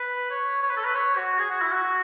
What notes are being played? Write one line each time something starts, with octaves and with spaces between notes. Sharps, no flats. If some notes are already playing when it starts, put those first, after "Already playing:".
Already playing: B4
C#5
C#5
B4
A4
B4
C#5
F#4
G#4
F#4
E4
F#4